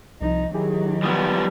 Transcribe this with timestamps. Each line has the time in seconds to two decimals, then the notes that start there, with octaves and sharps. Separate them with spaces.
0.21 C2 F3 D#4
0.54 D#3 F#3 E4 G4 G#4
1.03 F3 G3 B3 D#6